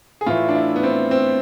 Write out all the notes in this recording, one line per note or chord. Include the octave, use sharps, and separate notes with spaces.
G#4
A2 E3 A3 F4
D4
E4
B3
C4
C4